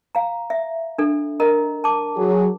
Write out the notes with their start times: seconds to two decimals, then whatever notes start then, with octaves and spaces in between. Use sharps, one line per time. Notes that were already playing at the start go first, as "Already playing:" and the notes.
0.15 F5 A#5
0.50 E5
0.98 D4 A4
1.40 A#4 D#5 A#5
1.84 A5 D6
2.16 F#3 G#4